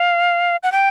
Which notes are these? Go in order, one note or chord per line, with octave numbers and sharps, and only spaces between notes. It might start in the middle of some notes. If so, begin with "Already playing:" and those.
Already playing: F5
F#5
G5